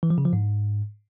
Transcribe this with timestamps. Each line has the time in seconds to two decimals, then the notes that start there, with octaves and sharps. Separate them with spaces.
0.03 E3
0.10 F3
0.18 C#3
0.25 F3
0.33 G#2